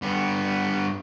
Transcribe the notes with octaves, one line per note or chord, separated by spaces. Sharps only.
G2 B3